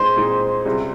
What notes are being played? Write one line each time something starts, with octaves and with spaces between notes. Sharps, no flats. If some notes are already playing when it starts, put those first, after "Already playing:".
Already playing: A#2 G#3 C4 D#4 C5
A#2 G#3 C4 D#4
C#2 C3 G3